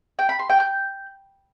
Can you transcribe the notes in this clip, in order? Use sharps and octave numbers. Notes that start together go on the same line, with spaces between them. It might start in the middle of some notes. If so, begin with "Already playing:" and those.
G5
B5
C6
G5
G6